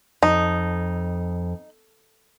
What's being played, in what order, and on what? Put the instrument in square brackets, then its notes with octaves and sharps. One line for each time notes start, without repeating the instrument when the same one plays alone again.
[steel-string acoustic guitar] F2 [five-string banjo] D#4